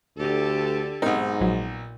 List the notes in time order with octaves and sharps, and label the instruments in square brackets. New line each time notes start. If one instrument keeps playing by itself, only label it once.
[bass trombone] D2 [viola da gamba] D3 G4 A4
[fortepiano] B1 D#4 [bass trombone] G#2 [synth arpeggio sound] C4 A#4 C5
[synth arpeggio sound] A#1 F#3 [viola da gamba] A#2